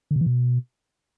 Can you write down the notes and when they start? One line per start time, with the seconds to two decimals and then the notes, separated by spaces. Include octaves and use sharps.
0.11 D3
0.16 C3
0.21 E3
0.26 B2